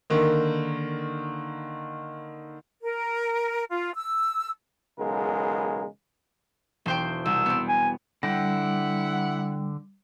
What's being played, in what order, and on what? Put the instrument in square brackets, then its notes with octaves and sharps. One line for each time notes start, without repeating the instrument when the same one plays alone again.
[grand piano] D3 D#3 A#3
[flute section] A#4
F4
E6
[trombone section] B1 E2 C#3 G#3 A#4
[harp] E1 C5 G5
[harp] C2 [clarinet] E6
[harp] B3 C4
[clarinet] G#5
[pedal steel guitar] D3 G5 [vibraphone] G3 [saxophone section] E4 F#5